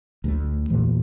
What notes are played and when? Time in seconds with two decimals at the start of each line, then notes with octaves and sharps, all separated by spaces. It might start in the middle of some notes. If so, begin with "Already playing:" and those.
0.24 D2 F#3 A3
0.70 E2 A#2 E3